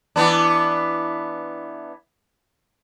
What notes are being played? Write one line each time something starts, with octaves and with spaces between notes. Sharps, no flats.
E3 B3 D4